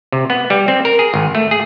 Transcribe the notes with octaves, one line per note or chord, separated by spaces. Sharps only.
C3
B3
G3
C4
A#4
G#4
G#1
A3
G#4